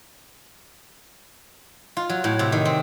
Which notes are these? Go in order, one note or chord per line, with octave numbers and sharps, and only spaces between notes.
F4
F#3
A2
C3
D#3
C4